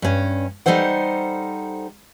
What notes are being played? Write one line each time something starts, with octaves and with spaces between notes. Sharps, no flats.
G2 C#4
G3 D#4 A4 C5 F#5